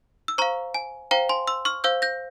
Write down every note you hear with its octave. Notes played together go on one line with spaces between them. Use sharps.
E6
C5 F5 A#5 C#6
G#5
C5 F5 G5 A#5
G#5 C6
C6 E6
C#6 F6
C5 F5 E6 G6
G6 A#6